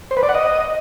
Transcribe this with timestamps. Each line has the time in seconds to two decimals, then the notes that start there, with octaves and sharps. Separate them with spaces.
0.11 C5
0.17 B4
0.23 D5
0.29 F#5
0.35 D#5